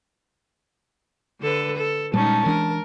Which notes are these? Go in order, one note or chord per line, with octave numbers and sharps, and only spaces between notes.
D3 A4 B4
A4
A#2 G3 G#3 C#4 D#4 A5
E3 D4 A#4